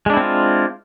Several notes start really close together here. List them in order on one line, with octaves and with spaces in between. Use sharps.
G#3 D4 E4 C4 F4